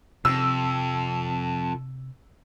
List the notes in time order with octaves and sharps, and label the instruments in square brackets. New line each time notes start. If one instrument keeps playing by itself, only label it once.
[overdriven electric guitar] F2 [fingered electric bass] C3 [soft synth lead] A5 [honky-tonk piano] E6